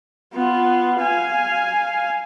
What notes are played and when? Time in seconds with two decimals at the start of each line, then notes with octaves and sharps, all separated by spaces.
0.34 B3 F4
1.01 F5 G#5